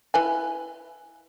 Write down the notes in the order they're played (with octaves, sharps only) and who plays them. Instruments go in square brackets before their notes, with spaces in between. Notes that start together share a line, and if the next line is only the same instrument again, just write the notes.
[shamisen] E4 B4 G#5